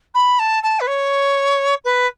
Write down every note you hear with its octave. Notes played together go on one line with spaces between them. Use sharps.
B5
A5
A5
B4
C#5
B4